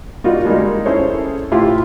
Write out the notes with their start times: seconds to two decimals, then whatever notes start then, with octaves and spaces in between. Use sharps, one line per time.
0.24 G3 A#3 D#4 F4 F#4
0.45 G3 G#3 A#3 D#4
0.86 C#4 E4 G#4 A4 C5 C#5
1.51 A2 E4 F4 G4 C6